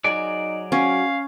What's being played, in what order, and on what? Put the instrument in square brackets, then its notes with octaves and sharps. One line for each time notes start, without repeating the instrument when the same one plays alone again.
[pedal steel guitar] F#3 G#4 D5 [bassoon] D#4
[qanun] C#4 [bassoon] F#4 [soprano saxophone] F5